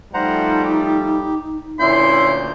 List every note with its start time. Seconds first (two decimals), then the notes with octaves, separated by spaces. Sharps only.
0.14 F3 G3 A3 D#4 C5 F#5 A#5
0.64 G4
1.80 D2 A#2 A#3 C#4 E4 C6 G6